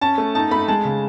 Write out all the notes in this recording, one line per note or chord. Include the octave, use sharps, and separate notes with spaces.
C#4 A5
A3
D#4 A5
A3 B5
G#3 A5
C#3